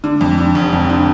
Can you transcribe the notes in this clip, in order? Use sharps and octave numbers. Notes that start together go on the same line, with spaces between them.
D3
F2
D3
F1
F2
D3